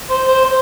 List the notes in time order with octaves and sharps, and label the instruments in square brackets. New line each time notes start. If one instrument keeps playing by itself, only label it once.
[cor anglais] C5
C5
C5